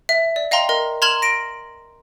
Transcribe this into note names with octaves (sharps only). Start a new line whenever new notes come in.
E5
D5
D#5 F5 G5 A#5 C6
A#4 D#5
A#5 C6 F6 G#6 E7 F#7
A#6 D7